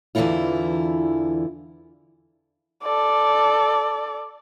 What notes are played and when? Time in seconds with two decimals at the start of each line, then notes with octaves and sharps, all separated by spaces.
0.15 E2 D3 E3 F#3 E4 F4
2.83 A4 D5